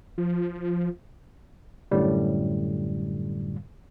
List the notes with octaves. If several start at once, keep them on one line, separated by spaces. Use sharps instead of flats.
F3
F#2 A2 D3 G3